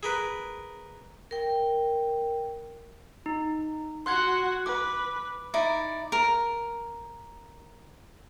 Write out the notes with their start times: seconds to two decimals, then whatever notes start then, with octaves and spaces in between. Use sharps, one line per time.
0.03 G#4 A#4 B4
1.31 A#4 G5
3.26 D#4
4.06 F#4 F#5 C6 F#6 G#6
4.66 B4 D6
5.54 D#4 E4 D5
6.12 A#4